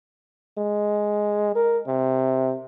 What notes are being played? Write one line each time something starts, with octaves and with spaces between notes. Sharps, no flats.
G#3
A#4
C3